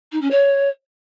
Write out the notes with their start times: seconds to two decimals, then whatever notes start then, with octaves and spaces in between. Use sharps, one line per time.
0.12 D#4
0.21 C#4
0.31 C#5